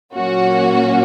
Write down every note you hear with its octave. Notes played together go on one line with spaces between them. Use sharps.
A#2 F#3 A#3 C#4 F#4